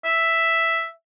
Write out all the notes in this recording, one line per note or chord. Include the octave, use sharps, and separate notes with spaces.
E5